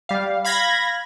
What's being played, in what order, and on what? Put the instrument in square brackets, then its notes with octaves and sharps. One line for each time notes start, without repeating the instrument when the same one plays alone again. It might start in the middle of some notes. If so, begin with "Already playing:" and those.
[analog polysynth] G3 F5
F5 B5 G#6 A#6